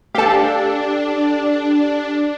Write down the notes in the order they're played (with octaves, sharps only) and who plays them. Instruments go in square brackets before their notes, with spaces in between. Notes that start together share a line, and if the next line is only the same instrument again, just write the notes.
[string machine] D4 [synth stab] G4 A4 [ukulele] F5 A5